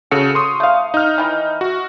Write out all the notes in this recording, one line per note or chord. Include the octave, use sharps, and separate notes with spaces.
C#3 F#4 A4 C#7
C6 C#6 D#6
A3 F5
D#4 F6
D#3 E3
F#4